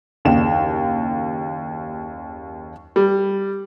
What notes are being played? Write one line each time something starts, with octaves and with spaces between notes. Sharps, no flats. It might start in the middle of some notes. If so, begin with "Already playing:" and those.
F#1 D#2 C#3 E7
G3